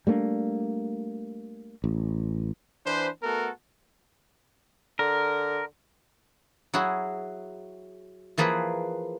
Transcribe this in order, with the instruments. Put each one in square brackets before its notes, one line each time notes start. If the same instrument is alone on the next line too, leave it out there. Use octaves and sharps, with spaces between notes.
[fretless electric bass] G3 A3 A#3 D4
A1
[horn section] E3 D4 B4 C5
A3 B3 F#4 A4 A#4
[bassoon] D3 [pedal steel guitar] A#4
[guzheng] F#3 E4 F#4 G#4
E3 F3 A#3 G#4 B4